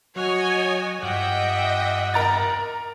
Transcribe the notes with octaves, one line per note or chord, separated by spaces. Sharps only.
F#3 F#4 C#5 D#5 G#5
G2 F3 G4 D#5 E5 F#5 G5
A#4 A#5 A6